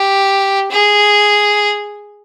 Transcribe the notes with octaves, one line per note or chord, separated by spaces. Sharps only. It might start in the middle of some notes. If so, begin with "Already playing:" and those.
Already playing: G4
G#4